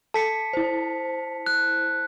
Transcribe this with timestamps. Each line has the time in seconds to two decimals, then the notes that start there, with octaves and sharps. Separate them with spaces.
0.14 A4 A5 B6 C#7
0.53 E4 C5
1.46 F#6